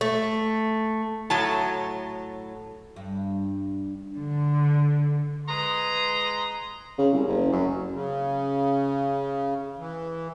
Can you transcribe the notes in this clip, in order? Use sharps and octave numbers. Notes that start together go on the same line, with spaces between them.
A3
A2 F#3 A5
G2
D3
G#3 B4 A#5 C6
C#3
C2
F#1
F#2
C#3
E3